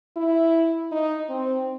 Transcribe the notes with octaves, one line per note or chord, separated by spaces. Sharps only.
E4
D#4
C4